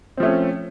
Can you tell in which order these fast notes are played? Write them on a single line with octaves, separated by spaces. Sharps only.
C4 F3 A3 C#4